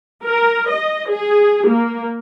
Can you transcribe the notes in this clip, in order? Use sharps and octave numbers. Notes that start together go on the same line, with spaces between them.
A#4
D#5
G#4
A#3